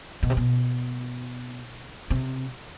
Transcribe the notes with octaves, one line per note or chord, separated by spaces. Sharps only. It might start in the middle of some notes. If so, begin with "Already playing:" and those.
B2
C3
B2
C3